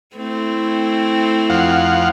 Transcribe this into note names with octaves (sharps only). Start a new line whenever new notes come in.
A3 C4 E4
F2 F5 F#5